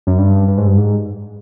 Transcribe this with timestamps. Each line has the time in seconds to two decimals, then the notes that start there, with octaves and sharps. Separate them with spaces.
0.07 F#2
0.19 G2
0.48 G2
0.58 G#2
0.67 G2
0.77 G#2